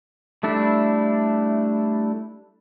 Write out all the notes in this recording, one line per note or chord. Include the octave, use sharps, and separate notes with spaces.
G3 A3 D4 E4